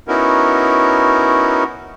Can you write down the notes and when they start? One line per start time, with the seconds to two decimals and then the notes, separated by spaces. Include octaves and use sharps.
0.08 B3 C#4 D#4 E4 F#4 A#4